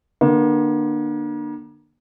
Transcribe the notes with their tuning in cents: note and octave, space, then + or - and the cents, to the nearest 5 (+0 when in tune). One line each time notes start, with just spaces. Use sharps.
D3 +35 A#3 +40